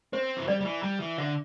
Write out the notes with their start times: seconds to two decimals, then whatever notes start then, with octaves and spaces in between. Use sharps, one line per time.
0.13 C4 C5
0.36 E3
0.47 G3 D5
0.61 G3
0.65 E3
0.83 G3
1.00 E3
1.18 D3 E5